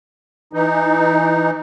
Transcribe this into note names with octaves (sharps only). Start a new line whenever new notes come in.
E3 D#4